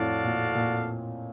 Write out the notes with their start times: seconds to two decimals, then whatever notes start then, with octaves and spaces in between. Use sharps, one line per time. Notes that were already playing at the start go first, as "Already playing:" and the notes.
Already playing: F2 A2 F#4 A4 D5 F5
0.24 A#2
0.55 A#2